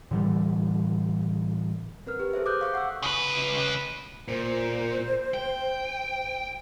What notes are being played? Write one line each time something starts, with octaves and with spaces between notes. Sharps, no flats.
A2 D3 E3 G3
C4 A#4 B4 F6
G4 B4
G#4 A4 C5 E5
D6 D#6 F#6 G6
F5 C#6 D6 F#6
F#5 C#6 D6 E6
C#3 B4
A#2 C5
G5